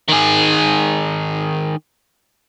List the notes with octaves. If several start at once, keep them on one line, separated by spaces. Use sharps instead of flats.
D#3 G#4